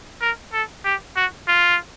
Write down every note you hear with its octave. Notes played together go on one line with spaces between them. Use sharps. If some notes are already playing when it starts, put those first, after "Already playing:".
A#4
A4
G4
F#4
F4